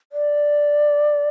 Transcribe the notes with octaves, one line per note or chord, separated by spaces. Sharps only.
D5